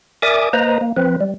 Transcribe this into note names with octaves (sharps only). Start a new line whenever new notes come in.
A#4 D5 E5 G#5 D6 D#6
A#3 B4 C5 D#5 A#5
A#3
F3 C4 B4
G3